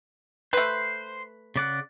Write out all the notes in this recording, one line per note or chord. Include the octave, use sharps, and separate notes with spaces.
A3 B4 C5
C#3 D5 F#5